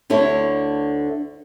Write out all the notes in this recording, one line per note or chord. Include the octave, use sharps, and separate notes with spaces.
D2 D3 E4 C#5